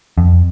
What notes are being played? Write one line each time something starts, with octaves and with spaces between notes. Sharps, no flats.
F2